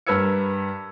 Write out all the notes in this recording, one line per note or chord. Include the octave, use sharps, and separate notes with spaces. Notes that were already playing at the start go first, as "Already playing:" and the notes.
G2 A#4 B4 E6 G#6 C#7